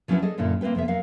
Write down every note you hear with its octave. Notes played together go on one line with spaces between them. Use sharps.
F3 F#3 C#4 D4 E4 B4
G#4 A4 D5 D#5
F#2 A#2 D3 E4
A#3 C4 C#4 B4 G5
F2 C3 B3 E5
F#3 A#4 F5